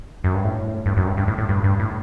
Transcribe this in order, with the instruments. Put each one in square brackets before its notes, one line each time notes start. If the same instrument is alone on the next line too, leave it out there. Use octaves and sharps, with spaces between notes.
[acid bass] F#2
G2
A2
G2
F#2
G2
G2
A2
A2
G2
G2
A2